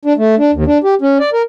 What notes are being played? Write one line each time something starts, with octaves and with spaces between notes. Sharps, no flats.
D4
A3
D4
D#2
D4
G4
C#4
D5
A#4